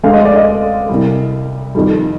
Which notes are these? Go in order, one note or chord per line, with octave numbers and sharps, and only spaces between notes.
D2 D3 G#3 C4 F5
D#5
D5
D#5
C2 C3 G3
F2 D#3 G3